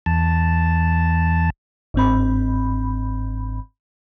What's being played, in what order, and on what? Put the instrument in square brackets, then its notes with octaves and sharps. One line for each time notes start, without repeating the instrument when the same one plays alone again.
[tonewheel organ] E2 A5
[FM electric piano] G1 G#2 C4 B5